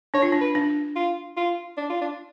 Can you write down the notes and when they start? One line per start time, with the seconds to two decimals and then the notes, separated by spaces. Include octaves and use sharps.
0.14 D4 C#5
0.22 F4
0.32 D4
0.41 B4
0.55 D4
0.96 F4
1.37 F4
1.77 D4
1.89 F4
2.01 D4